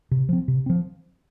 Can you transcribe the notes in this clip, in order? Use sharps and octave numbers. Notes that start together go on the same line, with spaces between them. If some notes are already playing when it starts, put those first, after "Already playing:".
C3
F3 C4
C3
F3 C4